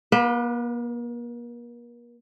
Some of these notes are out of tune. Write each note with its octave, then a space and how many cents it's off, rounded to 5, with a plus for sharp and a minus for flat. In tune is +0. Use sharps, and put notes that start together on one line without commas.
A#3 +40 B4 -5